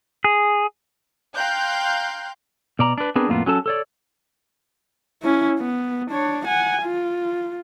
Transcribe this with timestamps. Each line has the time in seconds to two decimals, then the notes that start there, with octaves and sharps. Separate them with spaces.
0.24 G#4
1.36 F5 G5 A#5 C6 F#6 G6
2.79 B2 D5 A#5
2.98 D4 B4
3.16 B3 C4 D4 G#4 A#4 B4
3.29 F2 A2 A#3 B3 F4
3.46 F#3 C#4 A4 A5
3.66 A4 C#5 D5
5.22 C#4 E4
5.59 B3
6.10 D4 C#5
6.45 F#5 G#5
6.83 F4